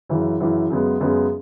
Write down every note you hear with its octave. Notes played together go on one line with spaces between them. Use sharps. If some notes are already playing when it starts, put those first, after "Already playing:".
F#2 C#3 E3
F#2 C#3 E3
F#2 C#3 G#3 B3
F#2 C#3 G#3 B3